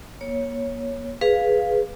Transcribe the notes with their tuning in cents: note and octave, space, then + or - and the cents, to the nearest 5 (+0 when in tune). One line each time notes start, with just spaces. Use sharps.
A#3 +40 C#5 +0
G#4 +0 B4 +0 F5 +0